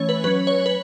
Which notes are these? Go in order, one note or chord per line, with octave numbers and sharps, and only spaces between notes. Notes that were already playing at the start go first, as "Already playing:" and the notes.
Already playing: E3 A3 C#4 C#5
B4
F#3 C#4 B4
C#5
B4